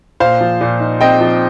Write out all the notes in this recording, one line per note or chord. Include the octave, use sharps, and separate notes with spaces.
A#2 C5 F5
F3
A#2
D#4
C4 D#5 G5
F3